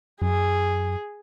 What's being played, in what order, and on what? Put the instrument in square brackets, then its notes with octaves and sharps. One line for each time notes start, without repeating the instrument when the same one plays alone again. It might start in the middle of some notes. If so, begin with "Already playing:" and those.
[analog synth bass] F#2 [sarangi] G#4